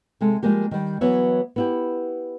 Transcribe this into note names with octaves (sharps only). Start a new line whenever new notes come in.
C3 G#3 A4
F3 G3 G#3 A#3 G4
D#3 G3
E3 F#3 B3 C#5 E5
B3 E4 G4